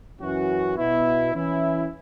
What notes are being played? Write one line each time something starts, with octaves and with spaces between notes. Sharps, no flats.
F#2 E3 C#4 F#4
B2 B3 E4
E3 C#4 E4